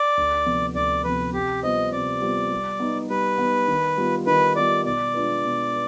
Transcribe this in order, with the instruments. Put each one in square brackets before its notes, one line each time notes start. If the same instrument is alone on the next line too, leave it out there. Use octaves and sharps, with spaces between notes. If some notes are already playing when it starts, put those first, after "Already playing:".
Already playing: [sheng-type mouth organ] D5
[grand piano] D2
C3 F3 B3
[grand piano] D2 [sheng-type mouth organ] D5
[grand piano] C3 F3 B3 [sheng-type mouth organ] B4
[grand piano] C3 [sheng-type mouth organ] G4
[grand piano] G3 B3 F4 C5 [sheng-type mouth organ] D#5
[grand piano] C3 [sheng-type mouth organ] D5
[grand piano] G3 B3 F4 C5
G3
B3 D#4
[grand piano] G3 [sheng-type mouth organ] B4
[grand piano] B3 D#4
D#3
G3 B3 F4
[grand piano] D#3 [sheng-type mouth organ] B4
[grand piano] G3 B3 F4 [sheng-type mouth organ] D5
[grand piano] B2 [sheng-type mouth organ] D5
[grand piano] G#3 D4 F4 B4
B2
B4